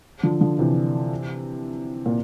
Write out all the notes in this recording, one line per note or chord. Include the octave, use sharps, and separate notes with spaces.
D3 F3
D3 F3
C3 E3
A#2